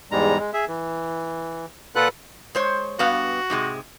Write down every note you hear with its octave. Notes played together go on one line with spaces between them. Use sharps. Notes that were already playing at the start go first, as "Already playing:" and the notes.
E2 G#2 G3 G#3 A#5
G#3
G#4 E5
E3
A#2 F4 A4 B4 F#5 F#6
G#3 C5 C#5
G2 B3 F#4 F5
G#2 C3 G#3